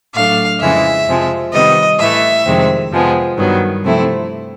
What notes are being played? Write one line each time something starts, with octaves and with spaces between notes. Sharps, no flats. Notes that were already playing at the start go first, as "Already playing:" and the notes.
A2 F#3 A3 D4 F5
F2 C#3 E3 G#3 E5
F2 C3 F3 G#3
C3 D#3 G3 B3 D#5
A2 E3 A3 E5
F2 C3 D#3 G#3 C4
F2 C3 F3 G#3 B3
G2 D#3 F#3 B3
C3 F3 A3 C4 E4